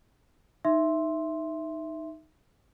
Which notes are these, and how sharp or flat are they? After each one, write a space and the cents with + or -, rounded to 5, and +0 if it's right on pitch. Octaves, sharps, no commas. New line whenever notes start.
D#4 +0 E5 +5 C6 +5